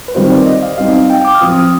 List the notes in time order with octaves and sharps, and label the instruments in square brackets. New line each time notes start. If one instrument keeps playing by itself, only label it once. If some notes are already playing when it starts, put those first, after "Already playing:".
[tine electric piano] B4
[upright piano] D#3 G3 C4 F4 [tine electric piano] C5
[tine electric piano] D5
D#5
F5
[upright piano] G3 C4 D#4 [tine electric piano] F5
[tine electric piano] G5
D6
F6
[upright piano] F3 C4 F4 [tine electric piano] D#6
[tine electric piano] D#6